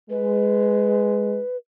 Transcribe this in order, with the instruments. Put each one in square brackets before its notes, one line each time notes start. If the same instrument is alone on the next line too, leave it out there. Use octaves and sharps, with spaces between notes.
[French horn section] G#3 [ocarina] B4